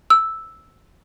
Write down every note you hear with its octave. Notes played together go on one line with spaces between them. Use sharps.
E6